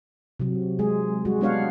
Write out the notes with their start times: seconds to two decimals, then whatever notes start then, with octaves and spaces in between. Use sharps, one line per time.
0.40 C3 F#3
0.79 G#3 G#4
1.25 G3 G#3 F#4
1.41 G#3 B3 D4 C#5 F5 F#5